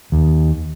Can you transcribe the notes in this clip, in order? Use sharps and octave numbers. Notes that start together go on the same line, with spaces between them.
D#2